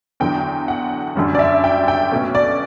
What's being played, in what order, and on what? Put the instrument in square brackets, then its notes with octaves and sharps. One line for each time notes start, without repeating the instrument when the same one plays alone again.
[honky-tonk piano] E2 D3 F#3 G5
F#5
F#2 D3 G3 C#4
D5
E5
G5
G5
B2 A3 C#4
D5